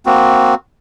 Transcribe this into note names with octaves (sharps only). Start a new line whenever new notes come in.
A#3 C4 F#4